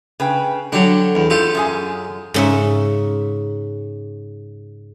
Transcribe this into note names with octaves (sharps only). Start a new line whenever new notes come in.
C#3 B4 G5
D3 F#3 D4 G4 A4
E2
F#2 F4 G4 A4
F#2 G#4 G#5
G#2 C#3 E5